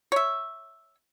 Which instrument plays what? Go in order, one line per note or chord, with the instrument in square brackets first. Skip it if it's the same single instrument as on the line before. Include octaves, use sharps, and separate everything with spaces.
[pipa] C#5 E5